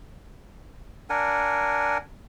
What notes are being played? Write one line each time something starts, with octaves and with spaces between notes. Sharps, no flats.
D4 A#4 F#5 G#5